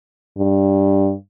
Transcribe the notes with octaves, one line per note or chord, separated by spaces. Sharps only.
G2